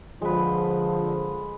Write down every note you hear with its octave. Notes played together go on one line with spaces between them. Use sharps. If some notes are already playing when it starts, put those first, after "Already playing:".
D3 F3 G#3 B4